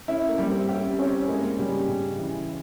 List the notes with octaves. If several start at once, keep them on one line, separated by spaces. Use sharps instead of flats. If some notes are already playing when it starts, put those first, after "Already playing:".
C#4 E4
A#3
G3
C4
C#4 G4
C4 C#4
G#3 A#3
C#3 G3
C#3
E3